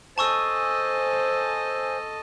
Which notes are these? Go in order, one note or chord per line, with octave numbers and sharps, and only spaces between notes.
A4 C5 D#5 G#5 A5 C#6 E6